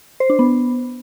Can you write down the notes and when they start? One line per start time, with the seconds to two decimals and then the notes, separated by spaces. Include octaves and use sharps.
0.20 C5
0.30 D4
0.39 B3